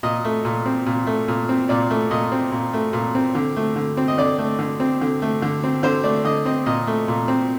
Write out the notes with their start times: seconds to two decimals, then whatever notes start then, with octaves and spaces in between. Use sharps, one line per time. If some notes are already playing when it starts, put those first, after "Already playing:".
0.03 A#2 D#5
0.25 A3
0.45 A#2
0.66 C4
0.86 A#2
1.07 A3
1.28 A#2
1.49 C4
1.69 A#2 D5
1.90 A3
2.11 A#2 D#5
2.32 C4
2.52 A#2
2.73 A3
2.93 A#2
3.15 C4
3.35 D3
3.56 A3
3.76 D3
3.97 C4
4.08 D#5
4.18 D3 D5
4.38 A3
4.59 D3
4.80 C4
5.01 D3
5.22 A3
5.42 D3
5.64 C4
5.83 D3 C5
6.04 A3 D5
6.25 D3 D#5
6.46 C4 D#5
6.66 A#2 D#5
6.87 A3
7.08 A#2
7.28 C4